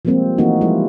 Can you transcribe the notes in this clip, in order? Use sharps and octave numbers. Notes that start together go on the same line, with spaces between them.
F3 G3 G#3 A#3 C4
E3 A3 A#3 C4 D#4 F#4
F3 G3 G#3 E4 F4